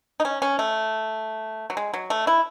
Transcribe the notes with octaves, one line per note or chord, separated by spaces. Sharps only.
D#4
C#4
C#4
A3
F#3
G#3
F#3
A3
E4